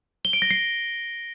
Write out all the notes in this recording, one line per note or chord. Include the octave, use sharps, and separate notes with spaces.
G7
D7
A#6
C7